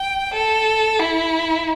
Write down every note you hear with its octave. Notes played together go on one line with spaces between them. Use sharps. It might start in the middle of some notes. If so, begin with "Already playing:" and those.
Already playing: G5
A4
E4